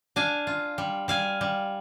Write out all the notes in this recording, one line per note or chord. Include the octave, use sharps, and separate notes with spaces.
D4 F5 G#5
F4
G3
G3 F5 G#5
G3